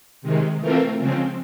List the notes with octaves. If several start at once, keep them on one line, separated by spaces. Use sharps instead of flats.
C3 D#3 G#3
E3 A3 C4 F4 A#4
C#3 F3 G#3 C4